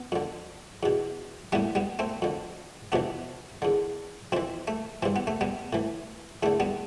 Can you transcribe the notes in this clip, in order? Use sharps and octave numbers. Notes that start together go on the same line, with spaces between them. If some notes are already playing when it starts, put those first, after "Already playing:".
Already playing: B3
F2 D3
E2 B2
A2 E3 G3 B3
G3 B3
A3 C4
F2 D3
F2 C3 E3 B3 D4
E2 D3
F2 E3 C4 E4
A3
G2 E3 C4
B3
A3
G3 B3
A2 E3
E2 D3 A3
G3 B3